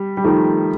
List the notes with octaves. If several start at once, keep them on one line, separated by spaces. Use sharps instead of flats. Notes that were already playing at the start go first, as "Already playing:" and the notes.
Already playing: G3
G3
D#3 F3 A3